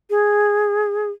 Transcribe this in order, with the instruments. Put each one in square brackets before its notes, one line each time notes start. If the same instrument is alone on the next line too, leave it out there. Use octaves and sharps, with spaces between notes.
[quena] G#4